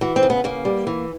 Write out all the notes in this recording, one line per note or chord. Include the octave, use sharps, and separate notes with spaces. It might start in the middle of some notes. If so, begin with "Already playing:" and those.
E3 F#4
C4
C#3
B3
C#3 A#3
G3
E3